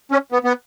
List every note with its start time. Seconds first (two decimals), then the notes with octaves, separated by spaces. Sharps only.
0.11 C#4
0.32 B3
0.44 B3